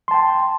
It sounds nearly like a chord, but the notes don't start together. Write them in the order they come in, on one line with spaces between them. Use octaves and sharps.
C6 A5 G5